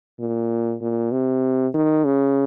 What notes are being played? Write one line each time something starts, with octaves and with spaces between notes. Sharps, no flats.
A#2
A#2
C3
D#3
C#3